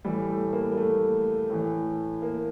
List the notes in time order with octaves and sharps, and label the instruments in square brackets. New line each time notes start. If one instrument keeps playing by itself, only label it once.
[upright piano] A2 E3 G3
A3
A#3
G3
A3
A2 E3
A#3